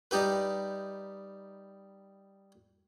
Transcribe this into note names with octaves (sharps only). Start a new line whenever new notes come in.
G3 D#4 G4 B4